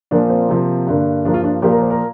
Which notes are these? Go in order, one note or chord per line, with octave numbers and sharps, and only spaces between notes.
A#2 F3 A#3 D4
C4
C3 F3 A#3
G2 D3 A#3
G2 F3 A#3 D4
F4
D4
A#2 F3 A#3 G4
A#4
C5
A#4